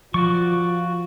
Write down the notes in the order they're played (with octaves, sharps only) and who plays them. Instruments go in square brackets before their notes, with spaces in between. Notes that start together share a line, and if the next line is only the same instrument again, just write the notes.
[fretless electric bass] F3 [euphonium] F4 [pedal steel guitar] F#4 D5 C#6